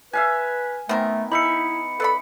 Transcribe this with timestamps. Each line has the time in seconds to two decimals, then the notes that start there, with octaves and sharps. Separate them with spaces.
0.13 B4 E5 F5 G#5
0.89 D#3 A3 B3 C4 A#4
1.32 D#4 E4 E5 B5 C#7
2.00 A4 B4 D5 B5